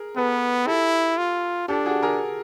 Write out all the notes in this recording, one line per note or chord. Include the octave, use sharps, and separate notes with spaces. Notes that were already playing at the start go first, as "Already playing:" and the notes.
Already playing: G#4 A#4
B3 A4 B4
E4 G4 A4
F4
D4 G4 A4
F#4 G#4
G#4 A#4